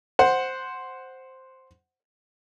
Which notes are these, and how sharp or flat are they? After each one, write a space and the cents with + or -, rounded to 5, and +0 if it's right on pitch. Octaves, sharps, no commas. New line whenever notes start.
C5 +0 F#5 +0